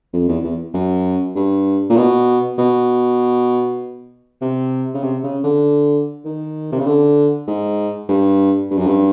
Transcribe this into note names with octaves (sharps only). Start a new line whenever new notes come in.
F2
E2
E2
F#2
G2
A#2
B2
B2
C3
C#3
C3
C#3
D3
D#3
C3
C#3
D3
G#2
G2
G2
F#2
G2